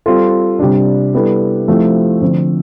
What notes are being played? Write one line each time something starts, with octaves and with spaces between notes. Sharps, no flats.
G3 C4 F4 A4
C3 G3 D4
G3 B3 E4 A4
F3 A3 C4 E4 G4
D3 F3 C4